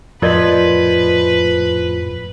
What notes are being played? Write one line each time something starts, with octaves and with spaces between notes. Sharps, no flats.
F2 A2 F3 A#4 B4 D5 D#5